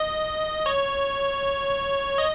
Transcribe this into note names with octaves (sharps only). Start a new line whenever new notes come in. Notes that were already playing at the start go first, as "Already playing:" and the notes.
Already playing: D#5
C#5
D#5